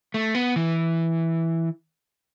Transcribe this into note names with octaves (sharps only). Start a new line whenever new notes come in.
A3
B3
E3